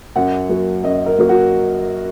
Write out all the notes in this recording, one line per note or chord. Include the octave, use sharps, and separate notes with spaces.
F#2 F#5
F#3 A#3
F#2 D#5
A#4
F#3 A#3
F#4